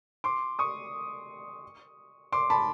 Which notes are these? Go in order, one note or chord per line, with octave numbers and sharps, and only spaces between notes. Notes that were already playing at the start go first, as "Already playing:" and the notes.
C6 D6
C#6 D#6
C6 D6
A5 B5